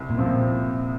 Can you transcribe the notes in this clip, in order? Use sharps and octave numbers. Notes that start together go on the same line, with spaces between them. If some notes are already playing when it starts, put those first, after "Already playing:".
Already playing: C2
A#2
C3 F3 C4
A#2